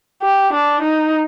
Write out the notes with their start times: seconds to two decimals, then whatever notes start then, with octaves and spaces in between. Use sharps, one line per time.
0.22 G4
0.53 D4
0.82 D#4